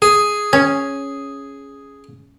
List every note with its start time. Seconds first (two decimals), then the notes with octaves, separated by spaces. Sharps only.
0.02 G#4
0.53 C#4